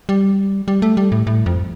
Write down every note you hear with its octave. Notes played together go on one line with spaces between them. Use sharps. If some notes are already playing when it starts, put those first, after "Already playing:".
G3
G3
A3
G3
A2
A2
F2